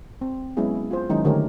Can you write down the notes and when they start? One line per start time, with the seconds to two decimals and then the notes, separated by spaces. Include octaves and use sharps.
0.21 C4
0.57 F#3 G#3 B3 C#4 E4 G#4
0.91 F4 C5
1.09 D#3 F#3 G#3 C#4 D#4 E4
1.25 D3 D#3 A3 G4 A#4 C#5